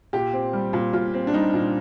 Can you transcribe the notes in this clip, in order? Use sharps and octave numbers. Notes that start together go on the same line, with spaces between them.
A#2 G4
C4
G3
A#2
A#2 F4
C4
D4
G3 D#4
A#2